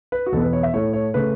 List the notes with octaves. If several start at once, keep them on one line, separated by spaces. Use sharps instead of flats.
B4
F#4
E2 B2 B3 A4
B4
C#5
E5
A2 A3 C#5
C#5
C#3 A3 B4